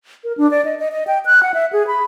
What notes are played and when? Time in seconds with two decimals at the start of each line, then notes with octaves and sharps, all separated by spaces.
0.24 A#4
0.38 D4
0.51 D5
0.65 D#5
0.79 D#5
0.92 D#5
1.07 G5
1.26 F#6
1.43 F#5
1.54 E5
1.73 G#4
1.87 B5